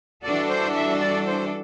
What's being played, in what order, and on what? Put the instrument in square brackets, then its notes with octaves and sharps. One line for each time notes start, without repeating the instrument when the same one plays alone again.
[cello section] E3 G3 D4 F#4 A4 [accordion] D5
[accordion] C5
E5
D5
C5